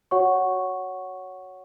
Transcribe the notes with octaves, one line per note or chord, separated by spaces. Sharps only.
F#4 C#5 F#5 C#6